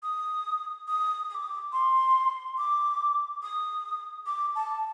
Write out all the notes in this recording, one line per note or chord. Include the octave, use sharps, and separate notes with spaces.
D#6
D#6
D#6
D6
C6
D6
D#6
D6
A5